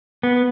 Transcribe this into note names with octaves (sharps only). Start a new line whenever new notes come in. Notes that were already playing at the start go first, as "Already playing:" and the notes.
B3